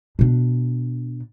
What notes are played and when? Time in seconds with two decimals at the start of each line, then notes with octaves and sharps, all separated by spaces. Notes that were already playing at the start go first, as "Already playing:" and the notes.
0.19 B2 D4